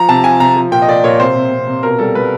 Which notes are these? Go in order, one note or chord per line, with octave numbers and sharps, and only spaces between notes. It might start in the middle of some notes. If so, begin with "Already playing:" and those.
Already playing: F3 A#5
C3 A5
F3 G#5
C3 A#5
F3
A#2 G5
D#5
A#2 D5
A#2 C#5
C3 C5
C3
C3
C3
B2 A#4
G3 A4
G3 B4